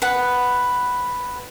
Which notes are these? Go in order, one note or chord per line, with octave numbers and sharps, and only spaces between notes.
B4 F#5